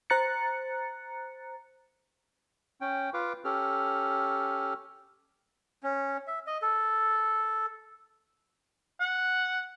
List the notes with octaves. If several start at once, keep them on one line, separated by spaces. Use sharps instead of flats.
C5 A#5 F#6 A6 C#7
C#4 G5
F4 B4 F5 D6
C#4 G4 A4 F6
C#4
E5
D#5
A4
F#5